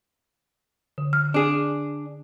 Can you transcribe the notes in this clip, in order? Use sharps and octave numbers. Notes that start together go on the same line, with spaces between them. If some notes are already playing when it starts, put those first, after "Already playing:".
D3
F6
D4 G#4